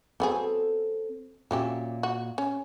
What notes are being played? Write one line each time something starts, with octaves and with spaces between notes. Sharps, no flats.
F#3 B3 C4 G#4 A4
A#2 F#3 C#4 G4 E5
F#4
C#4